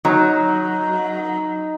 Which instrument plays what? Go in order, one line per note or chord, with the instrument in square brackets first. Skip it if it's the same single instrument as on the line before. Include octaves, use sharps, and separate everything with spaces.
[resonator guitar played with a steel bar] F#3 [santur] D#4